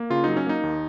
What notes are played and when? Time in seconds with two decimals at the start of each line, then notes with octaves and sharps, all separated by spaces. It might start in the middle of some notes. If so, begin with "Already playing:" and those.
Already playing: A#3
0.10 C#3 F4
0.24 F#3 D#4
0.37 C#4
0.46 A#3 D#4
0.63 D#2